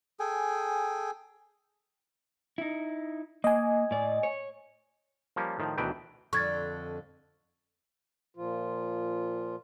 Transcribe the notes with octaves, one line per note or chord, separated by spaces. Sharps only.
G#4 A4 G5 G#5
D#4 E4
A#3 D#5 G#5
A2 D5
C#5
F3 G3 A#3 C#4
A2 D#3 F3
D2 B2 D#3 E3 B4 G5
F2 D3 C#6 G#6 A6
A#2 F3 F4